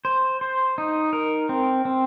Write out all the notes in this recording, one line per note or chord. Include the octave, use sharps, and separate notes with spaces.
C5
C5
D#4
A#4
C4
C4